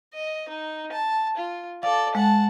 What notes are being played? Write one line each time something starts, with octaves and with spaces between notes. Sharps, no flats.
D#5
D#4
A5
F4
A4 D5 F5
G#3 F#5 A5